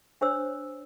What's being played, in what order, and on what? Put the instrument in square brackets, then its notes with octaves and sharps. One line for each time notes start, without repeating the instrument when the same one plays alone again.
[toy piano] D4 C5 C#5 E6